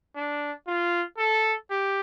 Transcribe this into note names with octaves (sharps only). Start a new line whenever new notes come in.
D4
F4
A4
G4